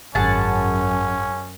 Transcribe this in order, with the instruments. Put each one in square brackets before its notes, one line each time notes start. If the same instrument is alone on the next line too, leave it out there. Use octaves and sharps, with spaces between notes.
[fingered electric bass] G#1 [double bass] F#2 [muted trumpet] C#4 [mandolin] G#4 F#5 A5